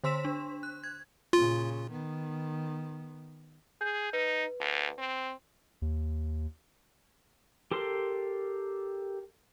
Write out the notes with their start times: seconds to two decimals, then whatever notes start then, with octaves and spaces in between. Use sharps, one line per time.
0.04 D3 C5 C6 E6 B6 E7
0.25 D4
0.63 F#6
0.84 G#6
1.33 A#2 C#3 F4
1.91 D#3 B3
3.81 G#4 G6
4.13 D#4 B4
4.60 D2
4.98 C4
5.82 D#2
7.71 G4 A4 A#4 C6